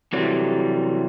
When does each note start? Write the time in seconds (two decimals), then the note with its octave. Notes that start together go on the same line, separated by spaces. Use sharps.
0.13 C3 E3 F#3 G3 A3